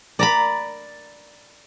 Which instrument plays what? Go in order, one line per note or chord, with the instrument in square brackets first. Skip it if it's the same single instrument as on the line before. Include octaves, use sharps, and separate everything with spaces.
[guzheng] D5 A#5 B5